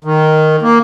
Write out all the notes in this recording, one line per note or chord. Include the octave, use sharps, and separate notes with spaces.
D#3
A#3